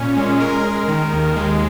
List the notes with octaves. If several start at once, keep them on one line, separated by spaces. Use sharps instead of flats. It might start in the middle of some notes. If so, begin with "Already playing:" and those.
Already playing: A#2 C#4
G#3
A#4
A#4
D#3
D#2
G#3